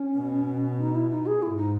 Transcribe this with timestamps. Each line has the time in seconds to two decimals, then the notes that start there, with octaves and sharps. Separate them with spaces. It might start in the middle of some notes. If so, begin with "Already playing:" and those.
Already playing: C#4
0.17 B2
0.80 D#4
0.95 E4
1.11 D#4
1.26 G#4
1.42 G#2 E4
1.57 D#4